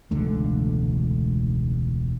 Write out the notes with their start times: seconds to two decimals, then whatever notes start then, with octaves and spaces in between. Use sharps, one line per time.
0.11 E1 C#2 D3 A3